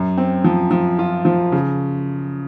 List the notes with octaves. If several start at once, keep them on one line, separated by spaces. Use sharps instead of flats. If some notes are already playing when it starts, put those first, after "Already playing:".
Already playing: F#2
C4
F3
F3
F4
F3
C#3